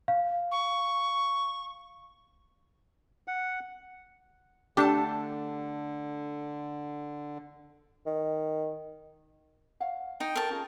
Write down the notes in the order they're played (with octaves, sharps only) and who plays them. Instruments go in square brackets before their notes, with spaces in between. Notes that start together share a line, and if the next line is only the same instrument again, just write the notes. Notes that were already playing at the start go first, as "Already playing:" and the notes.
[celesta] F5
[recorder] C#6
[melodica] F#5
[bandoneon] D3 [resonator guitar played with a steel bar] A3 A4 A5 [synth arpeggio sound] D4 G4
[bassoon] D#3
[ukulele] C#5 F5 F#5
[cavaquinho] D#4 [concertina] G5
[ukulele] F#4 A4 C5 [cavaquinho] A#4 A5
[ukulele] C#4 F4 G#4